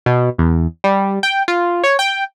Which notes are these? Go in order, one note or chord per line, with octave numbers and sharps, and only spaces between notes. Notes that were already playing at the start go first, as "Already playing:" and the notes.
B2
E2
G3
G5
F4
C#5
G5